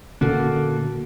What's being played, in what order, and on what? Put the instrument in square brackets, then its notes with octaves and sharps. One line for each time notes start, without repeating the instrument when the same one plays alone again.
[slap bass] A#2 D3 C#4 [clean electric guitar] A#3 F#4 A4